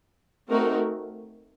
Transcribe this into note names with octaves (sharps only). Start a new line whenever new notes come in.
A3 C4 D#4 F#4 A#4